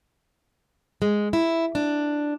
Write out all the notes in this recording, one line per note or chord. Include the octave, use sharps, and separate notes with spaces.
G#3
E4
D4